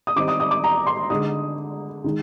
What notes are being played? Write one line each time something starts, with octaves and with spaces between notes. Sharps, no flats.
D#6
D#3 G3 C4 D#4 D6
D#6
D#6
D6
A#5
C6
D3 G#3 D#4 D#6
D#3 G#3